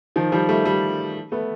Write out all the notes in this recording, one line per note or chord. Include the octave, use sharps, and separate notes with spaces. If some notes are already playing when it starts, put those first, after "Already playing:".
D#3 F3
F3 G3
G3 A3
G3 A3
A3 B3